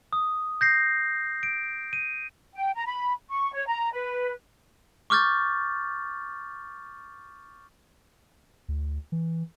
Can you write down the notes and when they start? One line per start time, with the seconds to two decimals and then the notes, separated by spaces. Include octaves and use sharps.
0.13 D#6
0.61 G6 A#6 C7
1.43 D7
1.93 D#7
2.54 G5
2.75 A#5
2.86 B5
3.30 C#6
3.54 C#5
3.67 A#5
3.93 B4
5.10 C#6 D6 F6 G6 A6
8.69 D2
9.12 E3